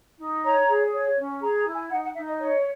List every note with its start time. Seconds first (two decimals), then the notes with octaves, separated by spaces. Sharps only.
0.18 D#4
0.44 C#5 A#5
0.67 G#4
0.92 C#5
1.16 C#4
1.41 G#4 A#5
1.57 A#5
1.66 E4
1.74 G#5
1.90 D#4 F#5
2.03 F#5
2.14 D#4 E5
2.27 D#5
2.39 C#5 D#5